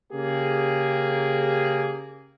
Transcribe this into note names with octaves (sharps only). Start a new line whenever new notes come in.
C#3 A#3 G4 G#4